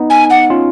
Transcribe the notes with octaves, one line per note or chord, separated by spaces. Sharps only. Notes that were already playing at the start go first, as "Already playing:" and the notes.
Already playing: B3 D#4
G#5
F#5
C#4 F4